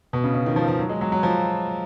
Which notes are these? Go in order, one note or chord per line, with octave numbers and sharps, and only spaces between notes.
B2
C#3
C#3
D#3
F3
F3
F#3
G#3
F#3
F#3
F3